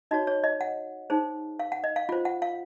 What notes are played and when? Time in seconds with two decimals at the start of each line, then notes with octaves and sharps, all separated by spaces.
0.11 D#4 F#4 C#5 D#5
0.27 C#5
0.44 D#5
0.61 F#5
1.10 D#4 G#4 C5
1.59 F5
1.72 F#5
1.84 D#5
1.96 F5
2.09 F4 C5
2.25 F#5
2.42 F5